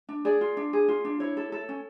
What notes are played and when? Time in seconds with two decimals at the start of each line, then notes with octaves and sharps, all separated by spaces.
0.09 D4
0.25 G#4 D5
0.41 F4
0.57 D4
0.73 G#4
0.88 F4
1.05 D4
1.20 E4 C#5
1.37 A4
1.52 A4
1.69 C#4